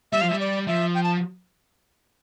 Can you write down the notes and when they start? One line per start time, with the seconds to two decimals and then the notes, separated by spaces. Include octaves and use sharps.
0.12 G3 E5
0.21 F3 F5
0.29 G3 E5
0.40 D5
0.67 F3 E5
0.95 G5
1.03 A5